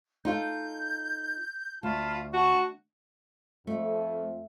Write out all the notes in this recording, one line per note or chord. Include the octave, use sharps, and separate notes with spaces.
D#4 F4 A4 G6
D2 F4 A5 B5
F#4 A5 C#6
F2 A3